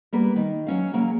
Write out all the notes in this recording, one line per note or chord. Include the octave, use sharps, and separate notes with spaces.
G3 A#3 B3 B4
D#3
F#3 C#4 F5
C#3 F#3 A#3